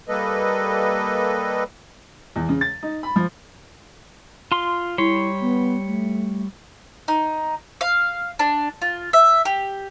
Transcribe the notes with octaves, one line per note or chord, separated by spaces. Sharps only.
G3 A#3 A4 B4 D#5
E2
C#3
A6
D#4
B5
F3
F4 C6
G3 E4 C#5 C6
B3
A3
D#4
F5
D4
F4
E5
G4